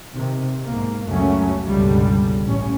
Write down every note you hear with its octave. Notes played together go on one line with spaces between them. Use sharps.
C3 D#3
B1 G#2 A#3
C#2 F#2 C#3 F#3 A3 C#4
G1 C#2 B2 D3 G3
A1 A2 C#4